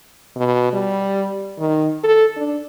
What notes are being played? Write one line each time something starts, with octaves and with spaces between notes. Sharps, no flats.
B2
G3
D#3
A4
D4